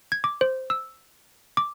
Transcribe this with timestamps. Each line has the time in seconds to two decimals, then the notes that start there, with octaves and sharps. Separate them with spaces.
0.12 G#6
0.24 D6
0.41 C5
0.70 E6
1.57 D6